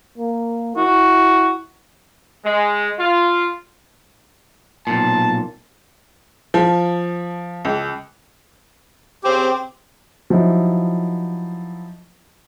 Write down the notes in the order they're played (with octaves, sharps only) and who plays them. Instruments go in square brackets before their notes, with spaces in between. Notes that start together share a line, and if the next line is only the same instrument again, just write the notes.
[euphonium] A#3
[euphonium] E4 [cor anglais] F#4
[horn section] G#3
F4
[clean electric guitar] B1 A#2 [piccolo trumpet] A5
[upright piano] F3
C#2
[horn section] C#3 C4 [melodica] G4
[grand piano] F3 F#3 D#4 E4